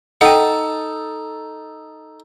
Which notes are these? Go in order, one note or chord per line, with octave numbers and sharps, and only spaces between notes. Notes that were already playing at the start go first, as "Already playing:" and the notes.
D#4 A4 F#5 G5